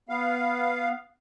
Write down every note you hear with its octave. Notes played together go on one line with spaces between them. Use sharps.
B3 F5